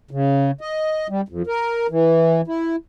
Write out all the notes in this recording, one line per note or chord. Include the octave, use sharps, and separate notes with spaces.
C#3
D#5
G3
F2
A#4
E3
E4